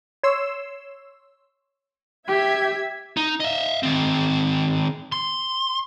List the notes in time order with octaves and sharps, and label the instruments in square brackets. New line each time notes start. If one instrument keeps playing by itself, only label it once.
[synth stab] C#5 C6 E6
[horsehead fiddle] G4 [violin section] E5 G#6 B6
[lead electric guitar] D#4
D#5 E5
D#3 C4
C6